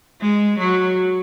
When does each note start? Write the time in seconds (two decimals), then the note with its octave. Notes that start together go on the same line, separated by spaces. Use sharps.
0.21 G#3
0.59 F#3